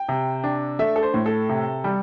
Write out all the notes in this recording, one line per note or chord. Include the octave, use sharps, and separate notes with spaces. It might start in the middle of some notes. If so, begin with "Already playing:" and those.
Already playing: G5
C3
D4
A3 E5
A4
C5
A2
A4
C3
G3